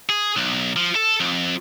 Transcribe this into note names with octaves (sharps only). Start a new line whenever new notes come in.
G#4
B1
F3
A4
F2